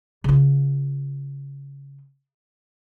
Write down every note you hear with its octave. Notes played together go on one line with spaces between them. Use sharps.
C#3 F4